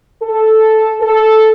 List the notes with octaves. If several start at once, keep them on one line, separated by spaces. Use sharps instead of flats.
A4
A4